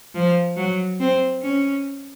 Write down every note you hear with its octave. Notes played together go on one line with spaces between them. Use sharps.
F3
F#3
C4
C#4